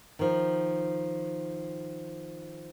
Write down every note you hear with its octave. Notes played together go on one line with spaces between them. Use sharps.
D#3 F3